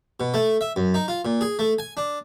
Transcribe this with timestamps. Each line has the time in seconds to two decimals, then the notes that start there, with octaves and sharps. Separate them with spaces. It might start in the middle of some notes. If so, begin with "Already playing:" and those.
0.20 B2
0.34 A3
0.61 E5
0.76 F#2
0.94 D#4
1.08 F4
1.25 A#2
1.41 G#4
1.59 A3
1.79 G#5
1.97 D4